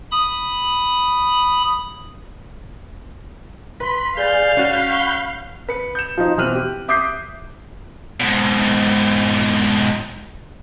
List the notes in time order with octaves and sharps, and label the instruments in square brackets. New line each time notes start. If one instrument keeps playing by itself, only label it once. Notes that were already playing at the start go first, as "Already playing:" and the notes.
[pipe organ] B5 D#6
[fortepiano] B4 [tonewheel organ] B5 [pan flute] C6
[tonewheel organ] G#4 G6 [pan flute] D5 [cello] F5
[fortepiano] C#4 F#4 [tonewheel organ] F#5 B5 G6
[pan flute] C#6
[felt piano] B4 C#7
G6 E7
F3 D#4
B2 E3 C4 F6 F#6 D#7
G4
E5 D6 D#6 G6 B6 C7
[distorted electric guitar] G#2 B2